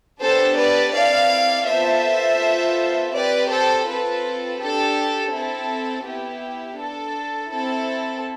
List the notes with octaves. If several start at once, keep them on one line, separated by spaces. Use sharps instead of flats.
B3 D4 G4 A4 C5
B4 D5
C4 E4 A4 D5 F5
B3 F4 A4 C5 E5
B3 F4 A4
C4 G4 B4 D5
A4 C5
C4 F4 A4 B4
D4 G4 A4
C4 E4 A4
B3 E4 G4
D4 A4
C4 E4 A4